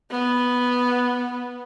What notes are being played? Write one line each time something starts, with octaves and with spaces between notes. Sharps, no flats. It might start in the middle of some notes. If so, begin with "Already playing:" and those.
B3